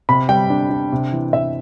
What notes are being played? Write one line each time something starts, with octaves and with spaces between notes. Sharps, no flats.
C3 B5
G3 G5
D4
D4
C3
E3
C3 E5